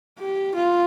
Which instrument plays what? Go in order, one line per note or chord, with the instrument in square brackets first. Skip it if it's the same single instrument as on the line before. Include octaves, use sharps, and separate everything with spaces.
[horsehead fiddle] G4
F4